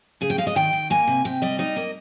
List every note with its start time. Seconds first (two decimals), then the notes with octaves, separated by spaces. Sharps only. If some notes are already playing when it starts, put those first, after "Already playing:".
0.21 C#3 G#4
0.30 G5
0.38 G#3 F5
0.47 D#5
0.56 D#3 G5
0.73 D#3
0.90 A#3 G#5
1.07 C3
1.25 C3 G5
1.42 G3 D#5
1.59 D#4 D#5
1.76 A#3